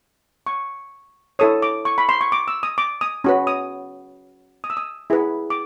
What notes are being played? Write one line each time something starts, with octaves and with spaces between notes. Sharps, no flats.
C#6
E4 A4 C#5 D#6
D6
C#6
B5
C6
C#6
D6
E6
D#6
D6
D#6
C#4 F#4 B4
D#6
D#6
E6
D#6
E4 G#4 B4
D6